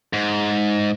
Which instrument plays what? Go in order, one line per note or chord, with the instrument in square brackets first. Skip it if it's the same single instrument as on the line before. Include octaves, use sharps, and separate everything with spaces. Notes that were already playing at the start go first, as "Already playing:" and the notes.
[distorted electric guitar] G#2